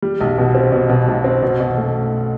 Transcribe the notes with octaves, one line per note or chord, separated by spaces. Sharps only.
G3
B1
B2
C4
B2
B2
B1
C4
B2
B2
A3